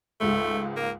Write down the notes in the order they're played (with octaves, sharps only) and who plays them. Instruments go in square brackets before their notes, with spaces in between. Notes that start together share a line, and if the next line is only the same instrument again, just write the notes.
[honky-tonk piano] C#2 G#2 G#3 [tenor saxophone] A3
[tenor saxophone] A#3